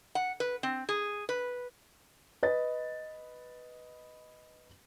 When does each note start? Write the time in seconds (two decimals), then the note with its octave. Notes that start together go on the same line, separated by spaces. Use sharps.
0.15 F#5
0.40 B4
0.63 C4
0.89 G#4
1.29 B4
2.43 B4 D#5 A6